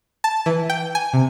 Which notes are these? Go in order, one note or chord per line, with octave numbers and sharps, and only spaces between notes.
A5
E3
G5
G#5
C3